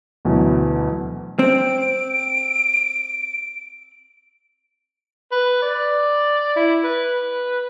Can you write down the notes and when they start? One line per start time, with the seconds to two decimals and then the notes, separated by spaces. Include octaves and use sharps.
0.25 D2 B2 E3 F#3
1.39 C4 D7
5.32 B4
5.62 D5
6.56 E4
6.84 B4